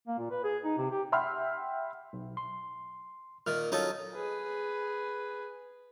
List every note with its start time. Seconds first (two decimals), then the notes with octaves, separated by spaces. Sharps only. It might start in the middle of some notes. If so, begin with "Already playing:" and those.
0.07 A#3
0.19 A#2
0.31 B4
0.44 G#4
0.64 D#4
0.77 C3
0.91 G4
1.12 E5 F#5 G5 B5 C6 F6
2.13 B1
2.37 C6
3.47 A#2 D#3 F6
3.72 F#3 C#4 D#4 F4 A4
4.15 G#4 B4